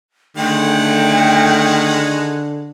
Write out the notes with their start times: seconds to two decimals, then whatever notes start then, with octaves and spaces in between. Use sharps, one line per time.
0.37 D3 D#3 G#3 A3 F#5 G5